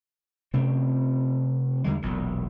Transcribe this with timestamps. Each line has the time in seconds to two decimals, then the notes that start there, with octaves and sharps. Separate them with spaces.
0.54 C3 A3 C4 C#4
1.84 E2 D3 G3 G#3
2.02 E1 B1 A#2